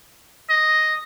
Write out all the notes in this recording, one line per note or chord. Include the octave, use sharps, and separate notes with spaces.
D#5